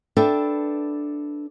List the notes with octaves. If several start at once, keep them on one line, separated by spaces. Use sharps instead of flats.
D4 A4 B4 E5 G5